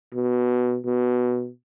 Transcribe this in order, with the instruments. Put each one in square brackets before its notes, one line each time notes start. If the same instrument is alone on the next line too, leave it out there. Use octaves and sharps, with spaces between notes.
[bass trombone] B2
B2